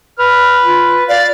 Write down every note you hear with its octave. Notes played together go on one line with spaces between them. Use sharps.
B4 F6
F4
D5 F5